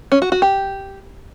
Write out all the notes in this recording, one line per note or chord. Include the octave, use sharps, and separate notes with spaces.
C#4
F#4
F#4
G4